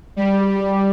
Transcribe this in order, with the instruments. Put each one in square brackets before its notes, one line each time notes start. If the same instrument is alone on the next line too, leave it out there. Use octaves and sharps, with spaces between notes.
[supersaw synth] G3